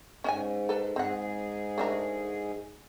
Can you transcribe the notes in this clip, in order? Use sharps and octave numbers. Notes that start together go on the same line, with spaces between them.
G#2 C#4 D#5 G#5
A4 B4
G#2 C4 G#4 F#5
A3 D4 A#4